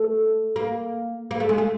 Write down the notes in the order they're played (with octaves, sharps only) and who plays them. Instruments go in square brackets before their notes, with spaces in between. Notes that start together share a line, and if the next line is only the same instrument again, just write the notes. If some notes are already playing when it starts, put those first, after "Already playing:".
Already playing: [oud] A3
A#3
A#3
A3
G#3
A3